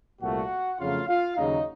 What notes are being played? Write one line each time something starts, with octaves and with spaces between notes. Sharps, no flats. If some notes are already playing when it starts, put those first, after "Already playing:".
C2 A#2 A3 F#4 F#5
F2 C#3 F#3 A3 F4 F5
F4 F5
D#2 C#3 F#3 D#4 D#5